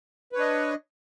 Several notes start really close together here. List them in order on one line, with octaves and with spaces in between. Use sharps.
B4 C#5 D4 D#5